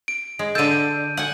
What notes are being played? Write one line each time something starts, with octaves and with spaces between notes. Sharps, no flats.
D7
G#3
D3 A4 G6 D#7
F#5 G#5